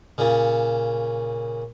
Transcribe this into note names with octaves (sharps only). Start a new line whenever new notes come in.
A#2 C#3